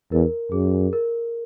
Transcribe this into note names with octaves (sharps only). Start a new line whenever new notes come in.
E2 A#4
F#2 G#4
A#4